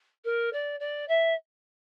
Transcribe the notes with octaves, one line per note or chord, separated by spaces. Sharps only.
A#4
D5
D5
E5